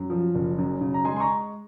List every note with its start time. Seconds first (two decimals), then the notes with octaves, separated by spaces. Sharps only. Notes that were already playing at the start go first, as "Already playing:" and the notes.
Already playing: F#2
0.10 F3
0.35 F#1
0.58 F#2
0.81 C#3
0.94 A#5
1.04 G#3 G#5 C6
1.16 C6
1.20 A#5 C#6